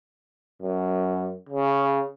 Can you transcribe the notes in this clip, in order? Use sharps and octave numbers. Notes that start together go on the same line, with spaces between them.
F#2
C#3